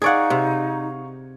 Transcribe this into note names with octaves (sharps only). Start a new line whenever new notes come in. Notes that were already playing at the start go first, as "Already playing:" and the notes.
D#4 G#4 D5 F5 F#5 C#6 G#6
C3